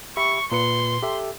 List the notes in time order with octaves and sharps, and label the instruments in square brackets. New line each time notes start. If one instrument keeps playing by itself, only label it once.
[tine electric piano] G4 E5 B5 [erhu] C#6
[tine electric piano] A#2 B4 C#7 [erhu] C6
[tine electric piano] G4 A4 E5